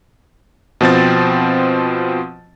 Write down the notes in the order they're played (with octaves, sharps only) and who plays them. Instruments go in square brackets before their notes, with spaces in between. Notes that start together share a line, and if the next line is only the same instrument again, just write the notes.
[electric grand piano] B2 F3 C4 A6